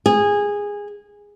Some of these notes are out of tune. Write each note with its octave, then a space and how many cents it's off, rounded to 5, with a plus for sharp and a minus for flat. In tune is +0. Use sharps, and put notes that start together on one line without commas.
G#4 -15